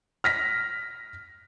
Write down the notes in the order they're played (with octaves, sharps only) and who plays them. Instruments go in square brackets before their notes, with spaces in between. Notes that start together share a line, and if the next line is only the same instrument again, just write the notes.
[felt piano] F6 A#6 B6